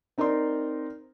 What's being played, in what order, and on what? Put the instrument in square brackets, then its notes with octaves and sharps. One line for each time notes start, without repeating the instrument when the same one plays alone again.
[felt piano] C4 D#4 A#4 D5 C6